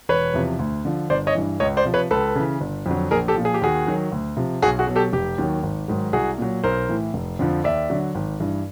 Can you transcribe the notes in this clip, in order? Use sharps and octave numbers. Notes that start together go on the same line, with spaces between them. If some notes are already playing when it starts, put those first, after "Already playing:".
E1 B4 C#5
E2 C3 F3
D2
D3 F3
G1 C5 D5
C#5 D#5
G2 E3
C#2 C#5 D#5
C5 D5
C3 F3
B4 C#5
C#2 A4 B4
C#3 E3
G1
F2 D3 F#3
A#1 G#4 A#4
G4 A4
A#2 F3
G#4
G4
D#2 F#4 G#4
D#3 F#3
D2
C3 F3
B1 F#4 G#4
F#4 G#4
B2 F#3
G4 A4
F1 G4
D#2 D#3 F#3
G#1
G#2 D#3 F#3
C2 F#4 G#4
A#2 F#3
B1 A#4 C5
A2 E3
F1
F2 D3 F3
D#2 D5 E5
D3 F#3
G#1
G2 E3